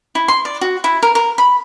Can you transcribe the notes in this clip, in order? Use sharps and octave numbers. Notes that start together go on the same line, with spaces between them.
E4
C6
D5
F#4
E4
A#4
A#4
B5